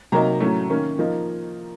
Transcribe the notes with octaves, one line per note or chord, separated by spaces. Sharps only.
C3 F#3 A#3 D#4 A#5
A2 F#3 A3 C#4
D#3 A#3 C#4
F3 A#3 D#4